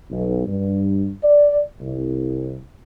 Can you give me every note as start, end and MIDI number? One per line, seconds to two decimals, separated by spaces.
0.11 0.43 35
0.45 1.09 43
1.23 1.60 74
1.80 2.56 36